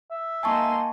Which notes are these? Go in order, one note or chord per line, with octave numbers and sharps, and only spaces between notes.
E5
A#3 D#4 G#5 A5 C6 C#6